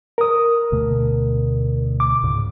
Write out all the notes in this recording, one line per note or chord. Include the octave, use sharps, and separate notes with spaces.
A#4 D#6
D2 B2 A3
D6
C#2 G#2 C#3